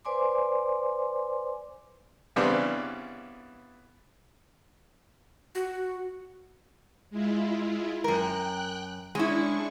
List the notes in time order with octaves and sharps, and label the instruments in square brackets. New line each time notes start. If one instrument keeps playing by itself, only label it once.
[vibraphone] B4 C5 D5 G#5 C6 D6
[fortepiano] C#3 E3 G3 B3 C4 D4
[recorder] F#4
[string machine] G#3 E4 F4
[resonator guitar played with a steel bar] F#2 A#4 [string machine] G5 F#6
[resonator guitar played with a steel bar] G#3 C#4 E4 [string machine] D4 C#6